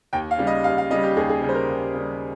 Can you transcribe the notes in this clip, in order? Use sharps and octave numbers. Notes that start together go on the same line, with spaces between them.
D#2 G5
F5
C#3 G3
D#5
D#2 F5
F5
C#3 G3 D#5
G4
D#2 G#4
G#4
C#3 G3
C5
A#4
D#2
C#3 G3